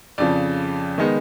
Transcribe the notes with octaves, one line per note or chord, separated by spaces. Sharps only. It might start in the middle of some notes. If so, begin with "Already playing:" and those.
F2 C#3 F3 D5
D#3 G#3 B3 D#4